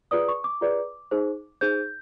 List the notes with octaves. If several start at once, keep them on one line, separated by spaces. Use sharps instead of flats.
F4 G#4 B4 D5 D#6
C#6
D6
F4 G#4 B4 D5
D#4 G#4 C5
D#4 G#4 C5 G6